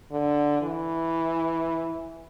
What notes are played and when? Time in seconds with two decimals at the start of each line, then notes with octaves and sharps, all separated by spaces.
0.12 D3
0.62 E3